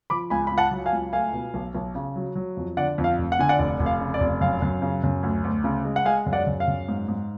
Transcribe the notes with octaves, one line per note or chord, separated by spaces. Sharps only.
F3 B5 D6
C#2 G#5 B5
C#2 B5
F#5 A5
F#3
F5 G#5
C#2
A3 F5 G#5
B2
B1
B1
C#3
F#3
F#3
F2
D3 D5 F#5
F2
F5
F1
F#5
D3 G#5
D5 F#5
F1 D5
F1
F5
C#3
D5
F1
F#2 F5
F#2
C#3
F#2
D2
D2
C#3
G#3
F#5
G#3 F5 G#5
F#2
D5 F#5
F#2
F5
F#2
G#2
G#2